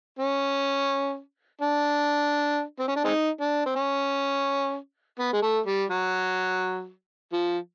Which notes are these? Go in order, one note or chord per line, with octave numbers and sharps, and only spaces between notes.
C#4
D4
C4
C#4
D4
G#3 C4 D#4
D4
C4
C#4
B3
G#3
A3
G3
F#3
F3